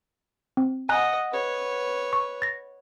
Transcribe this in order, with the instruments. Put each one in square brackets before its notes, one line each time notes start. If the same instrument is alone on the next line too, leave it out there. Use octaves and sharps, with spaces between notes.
[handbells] C4
[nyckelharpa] D#5 F#5 [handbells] G#5 A#5 F#6
[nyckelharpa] B4 C#5
[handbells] C#6
A6 A#6